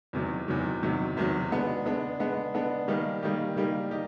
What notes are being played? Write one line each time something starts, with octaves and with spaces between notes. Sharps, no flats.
E2 C3 D#3 F#3
E2 C3 D#3 F#3
E2 C3 D#3 F#3
E2 C3 D#3 F#3
G#3 B3 D4
G#3 B3 D4
G#3 B3 D4
G#3 B3 D4
D#3 G3 A#3 D#4 G4
D#3 G3 A#3 D#4 G4
D#3 G3 A#3 D#4 G4
D#4 G4